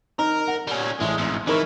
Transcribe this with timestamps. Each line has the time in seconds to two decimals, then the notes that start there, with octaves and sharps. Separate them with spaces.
0.19 D#4 A#4
0.48 F#5
0.67 G3 C#4
1.01 A1 G#3
1.18 F2 G#2
1.47 E3 D#4 E4 A#4 C#6